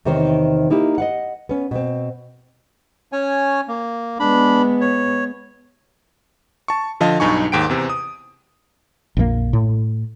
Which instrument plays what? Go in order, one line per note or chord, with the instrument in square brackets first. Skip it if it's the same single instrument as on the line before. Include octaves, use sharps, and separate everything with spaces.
[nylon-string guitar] E2 C3 D#3 D#4 C5 C#5
A#3 D#4 E4 G4
D#5 F5 F#5
B3 C#4
B2 C4
[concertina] C#4 C#5 G#5
A#3
[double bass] G#3 B3 [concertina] D4 B5
[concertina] C#5
[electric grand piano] A5 C#6
D3 F3 D#5 F5 A5
B1 G2 D#4 G#5 C#6
D#2 G#2 G5 D7
E2 C3
D#6
[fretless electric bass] A#1 F2 E3 A#3
A2